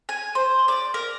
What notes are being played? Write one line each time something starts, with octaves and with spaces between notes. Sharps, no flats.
G#5
C5
D5
A#4